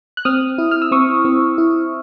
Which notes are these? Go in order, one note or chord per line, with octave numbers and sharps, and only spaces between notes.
F#6
C4 D#6 F6
E4
F6
E6
C4 C#6 D#6
C4
E4